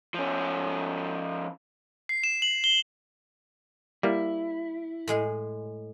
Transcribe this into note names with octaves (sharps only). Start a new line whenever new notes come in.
F3 C#4
C7
E7
F#7
G7
G3 A#3 E4
A2 G#3 G#4